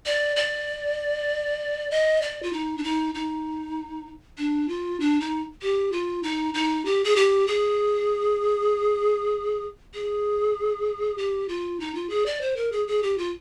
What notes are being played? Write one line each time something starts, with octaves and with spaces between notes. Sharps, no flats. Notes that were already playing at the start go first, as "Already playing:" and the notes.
D5
D5
D#5
D5
F4
D#4
D4
D#4
D#4
D4
F4
D4
D#4
G4
F4
D#4
D#4
G4
G#4
G4
G#4
G#4
G4
F4
D#4
F4
G#4
D5
C5
A#4
G#4
G#4
G4
F4